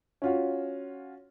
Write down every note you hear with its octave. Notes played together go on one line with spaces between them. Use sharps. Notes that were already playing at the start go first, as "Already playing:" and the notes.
C#4 F4 F#4